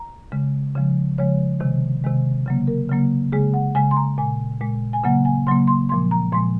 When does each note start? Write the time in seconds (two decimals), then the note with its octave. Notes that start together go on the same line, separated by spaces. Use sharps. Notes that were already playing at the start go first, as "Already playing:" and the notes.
Already playing: A#5
0.32 C#3 G#3
0.75 C#3 F3 G#3
1.18 C#3 F3 G#3 C#5
1.60 C3 D#3 G#3
2.04 C3 D#3 G#3
2.46 C#3 F#3 A#3
2.67 A#4
2.89 C#3 F#3 A#3
3.32 C#3 G#3 G#4
3.54 F#5
3.75 C#3 G#3 G#5
3.91 C6
3.96 A#5
4.18 A#2 G#3 G#5
4.61 A#2 G#3
4.93 G#5
5.04 C#3 F#3 A#3 F#5
5.25 G#5
5.47 C#3 F#3 A#3 C6
5.67 C6
5.89 A#2 F3 G#3 C6
6.11 A#5
6.32 A#2 F3 G#3 C6